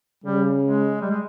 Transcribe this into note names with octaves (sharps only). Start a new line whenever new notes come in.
C#3 G3
G#3
G3
G#3